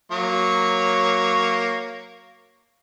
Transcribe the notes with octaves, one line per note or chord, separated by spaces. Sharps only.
F#3 A#3 C#5